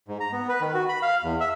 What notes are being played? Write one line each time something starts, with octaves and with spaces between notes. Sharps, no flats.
G#2
A#5
B3
B4
D#3
F#4
B5
F5
E2
E5